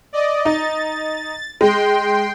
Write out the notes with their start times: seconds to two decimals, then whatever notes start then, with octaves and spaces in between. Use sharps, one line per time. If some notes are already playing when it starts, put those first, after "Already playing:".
0.13 D5 D#5
0.45 D#4 A6
1.61 G#3 G5 C6